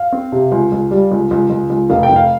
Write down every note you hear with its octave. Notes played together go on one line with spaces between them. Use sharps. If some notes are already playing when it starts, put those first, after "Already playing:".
Already playing: F5
C4
C3
C#2
C#2
G3
C#2
C#2
C#2
C#2
F1 F5
G5
F1
F5